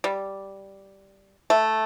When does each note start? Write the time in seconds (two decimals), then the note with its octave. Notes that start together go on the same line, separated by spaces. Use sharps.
0.04 G3
1.50 A3